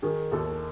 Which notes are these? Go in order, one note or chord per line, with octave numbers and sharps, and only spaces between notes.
D#3 G#4
D#2 A4